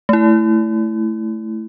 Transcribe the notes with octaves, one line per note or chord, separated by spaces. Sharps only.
A3 E4